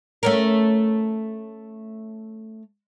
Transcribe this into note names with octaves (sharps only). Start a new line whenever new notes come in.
A3 C#4 A#4